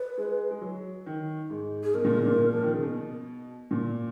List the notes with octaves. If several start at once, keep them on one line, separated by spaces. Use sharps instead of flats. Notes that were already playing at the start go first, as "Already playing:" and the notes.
Already playing: B4
G#3
G#3
F#3
D#3
G#2
G#4
B2 A#4
A#2
G#2
A#2
F3
D#3
C#3
B2
A#2